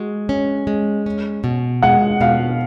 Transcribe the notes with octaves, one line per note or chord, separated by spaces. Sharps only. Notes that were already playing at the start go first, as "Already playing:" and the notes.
Already playing: G#3 F#4
C#4
G#3
C#4
B2
G#3 F#5
B2 F5